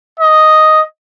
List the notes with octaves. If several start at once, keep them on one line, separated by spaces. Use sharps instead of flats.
D#5